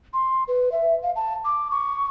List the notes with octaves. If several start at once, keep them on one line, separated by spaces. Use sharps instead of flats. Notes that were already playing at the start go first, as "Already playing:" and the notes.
C6
B4
E5
F5
A5
D6
C#6